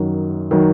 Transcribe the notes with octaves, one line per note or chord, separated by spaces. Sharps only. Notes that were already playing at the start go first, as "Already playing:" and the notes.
Already playing: F#2 D#3 F#3
D#3 F#3